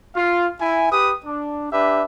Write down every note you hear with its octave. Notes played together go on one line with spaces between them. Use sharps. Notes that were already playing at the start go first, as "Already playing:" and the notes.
F4 F5
E4 E5 G#5
G4 B4 D#6
D4
D4 G4 B4 E5